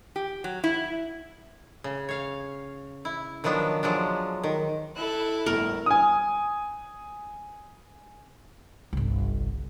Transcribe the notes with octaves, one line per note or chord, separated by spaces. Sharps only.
G4
F#3
E4
C#3
C#5 F5
E4
D#3 F3 F#3 B3 D4
F3 F#3 G#3 D4
D#3
E4 A4 F#6
G1 A2 A#4
G#5 D#6
G1 C2